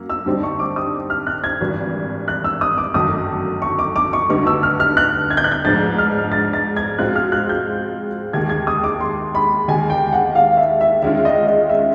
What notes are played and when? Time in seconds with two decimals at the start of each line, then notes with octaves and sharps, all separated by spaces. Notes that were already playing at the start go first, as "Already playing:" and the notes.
Already playing: F#2 A#3
0.10 E6
0.26 G2 D3 G3 C4 D#4
0.43 C#6
0.59 D6
0.76 D#6
1.10 F6
1.27 F#6
1.44 G#6
1.61 G#1 G2 E3
2.28 F#6
2.44 E6
2.61 D#6
2.78 D6
2.94 G1 F#2 D#3 F#3 A3 D#6
3.62 C#6
3.79 D6
3.96 D6
4.13 C#6
4.29 D2 D3 G3 B3 D#4 C#6
4.47 E6
4.63 F6
4.80 F6
4.97 F#6
5.30 G#6
5.37 G6
5.44 F#6
5.51 G6
5.65 G#2 F3 G#3 B3 D4 A6
5.98 F6
6.32 A6
6.53 A6
6.77 G#6
6.98 B2 G#3 C4 F4 F#6
7.16 F6
7.32 F#6
7.49 G6
8.33 D#2 D#3 G#3 G#6
8.50 G#6
8.67 D#6
8.84 D6
9.00 C6
9.35 B5
9.68 D#2 D#3 G#3 G#5
9.90 G5
10.13 F#5
10.35 F5
10.57 E5
10.81 E5
11.02 D#3 G#3 C#4 F4 E5
11.25 D#5
11.47 D#5
11.69 E5